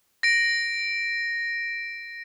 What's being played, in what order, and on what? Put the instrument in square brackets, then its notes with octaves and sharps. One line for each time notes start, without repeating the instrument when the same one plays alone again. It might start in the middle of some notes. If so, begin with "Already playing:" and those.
[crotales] A#6 D7